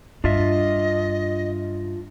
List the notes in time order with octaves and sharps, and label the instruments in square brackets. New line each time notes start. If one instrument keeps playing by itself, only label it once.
[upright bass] G2 [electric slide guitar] D4 F4 E5 [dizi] D#5